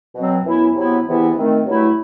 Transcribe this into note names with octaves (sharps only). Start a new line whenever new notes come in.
B2 F#3 C4
F#2 E3 B3 E4
C3 F#3 B3 E4
E2 C3 E3 B3 E4
D#3 A3 C4
G2 F#3 A3 E4